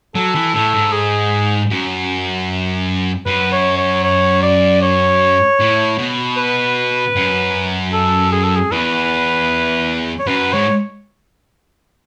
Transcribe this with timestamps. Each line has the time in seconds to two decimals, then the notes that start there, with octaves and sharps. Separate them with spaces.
0.15 F#3 A4
0.35 E3
0.54 A2 A4
0.74 G#2
0.92 G#4
1.71 F#2
3.26 F#2 B4
3.53 C#5
3.78 C#5
4.04 C#5
4.43 D5
4.82 C#5
5.60 A2
5.99 B2
6.37 B4
7.16 F#2
7.93 A4
8.32 G#4
8.44 A4
8.56 G#4
8.72 E2 B4
10.19 C#5
10.27 F#2 B4
10.53 G#2 C#5